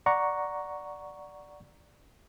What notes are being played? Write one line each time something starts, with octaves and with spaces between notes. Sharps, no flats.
D5 F#5 A#5 C#6